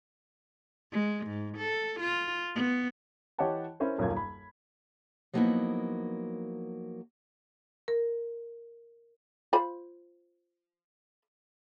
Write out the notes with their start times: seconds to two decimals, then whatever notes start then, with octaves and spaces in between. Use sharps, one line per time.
0.91 G#3
1.27 G#2
1.57 A4
2.00 F4
2.55 B3
3.38 E3 G4 C#5 D#5 F#5 A5
3.80 C#4 E4 A#4 C5
3.98 D#1 B1 F#2 A#3 F4 G#6
4.17 B5
5.33 F3 F#3 A#3 B3 D#4 E4
7.88 A#4
9.53 F4 C5 B5